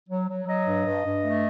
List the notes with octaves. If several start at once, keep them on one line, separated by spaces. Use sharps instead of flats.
F#3
F#3
F#3 D#5
G2
G2
G2
A3